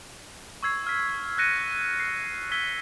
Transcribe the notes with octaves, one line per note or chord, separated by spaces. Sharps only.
C#6 E6 G#6 C7
F6 B6
F6 F#6 A6 A#6 C#7 D#7
C7
E6 G#6 B6 G7